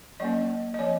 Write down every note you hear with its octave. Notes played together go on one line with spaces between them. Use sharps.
F#3 A#3 C#4 D#5
D#5
F3 C4 C#5